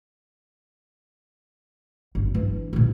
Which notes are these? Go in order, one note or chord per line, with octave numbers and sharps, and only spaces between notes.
G1
E3 D4
A#2 D#4